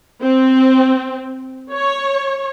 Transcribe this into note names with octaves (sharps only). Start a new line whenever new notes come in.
C4
C#5